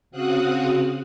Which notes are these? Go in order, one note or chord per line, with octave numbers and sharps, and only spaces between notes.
C#3 C4 F#4 F5 D#6 F#6